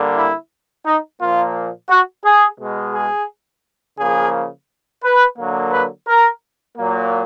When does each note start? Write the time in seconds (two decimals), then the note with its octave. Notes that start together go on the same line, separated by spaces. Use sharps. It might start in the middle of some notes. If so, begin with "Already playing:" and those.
Already playing: D3 G3 A#3
0.16 E4
0.86 D#4
1.20 A#2 F3 A#3 F4
1.89 F#4
2.24 G#4
2.60 B2 G#3
2.94 G#4
3.98 C#3 F3 A#3 G#4
5.04 B4
5.38 D3 F#3 A#3
5.73 B4
6.07 A#4
6.77 A#2 F#3 A#3